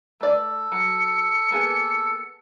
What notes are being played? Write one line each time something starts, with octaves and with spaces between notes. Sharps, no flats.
A3 A4 D5
F#3 C#7
A#3 B3 G#4